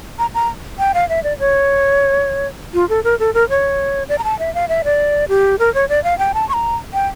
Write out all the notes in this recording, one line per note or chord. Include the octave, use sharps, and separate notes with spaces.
A#5
A#5
G5
F5
E5
D5
C#5
F4
A4
A#4
A4
A#4
C#5
D5
A#5
A5
E5
F5
E5
D5
G4
A#4
C#5
D5
F5
G5
A5
C#6
A#5
G5